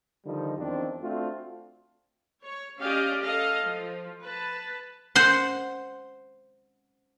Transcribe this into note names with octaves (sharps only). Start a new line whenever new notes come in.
D3 D#3 F3 G3 D#4
E2 D#3 F3 C4 D4
A3 C4 D4 F4 F#4
C#5
C#4 G4 D5 D#5 F5
A4 D#5 F5
F3
B4 A5
C5 F#5 C6